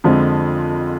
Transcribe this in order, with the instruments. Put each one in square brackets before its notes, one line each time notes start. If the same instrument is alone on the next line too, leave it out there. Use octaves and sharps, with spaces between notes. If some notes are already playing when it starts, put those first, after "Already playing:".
[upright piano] F2 D3 F3 G#3